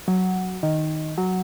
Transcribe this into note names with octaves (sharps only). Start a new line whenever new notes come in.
F#3
D#3
F#3